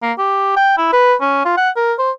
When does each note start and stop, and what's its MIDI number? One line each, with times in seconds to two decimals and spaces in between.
0.03 0.12 58
0.18 0.52 67
0.56 0.74 79
0.78 0.91 64
0.93 1.14 71
1.21 1.44 61
1.45 1.57 65
1.57 1.70 78
1.76 1.93 70
1.99 2.11 72